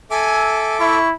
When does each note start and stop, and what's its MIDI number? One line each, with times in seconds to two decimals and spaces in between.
0.11 0.99 69
0.11 0.99 76
0.11 0.78 80
0.11 0.99 86
0.80 1.14 64
0.80 1.08 85